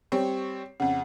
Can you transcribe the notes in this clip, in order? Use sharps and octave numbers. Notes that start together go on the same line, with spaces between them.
G3 C4 C#5
F2 C#3 F#5